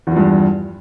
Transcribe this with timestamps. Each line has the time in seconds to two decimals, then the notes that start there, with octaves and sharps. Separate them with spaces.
0.07 E2
0.12 F3
0.16 G2